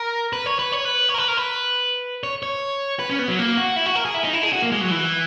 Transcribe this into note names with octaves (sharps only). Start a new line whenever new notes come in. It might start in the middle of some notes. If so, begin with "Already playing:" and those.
Already playing: A#4
B4
C#5
B4
C#5
B4
C#5
A#4
B4
A#4
B4
C#5
C#5
B4
C#4
B3
F#3
A#3
F#4
E4
F#4
A#4
G#4
E4
D#4
E4
G#4
F#4
A#3
G#3
F#3
E3